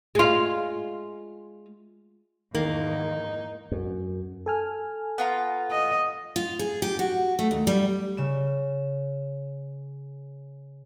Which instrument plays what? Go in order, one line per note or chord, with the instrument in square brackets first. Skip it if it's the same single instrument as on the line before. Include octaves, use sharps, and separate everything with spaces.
[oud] G#3 F4
[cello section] E2 G#2 [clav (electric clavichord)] D#3 [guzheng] A#3 [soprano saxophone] D#4
[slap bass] F#2
[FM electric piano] A4 G#5 F6
[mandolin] B3 F4 A#5
[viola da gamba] D#5
[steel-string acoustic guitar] F4
G#4
G4
F#4
A3
D#2
G3
[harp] C#3 E7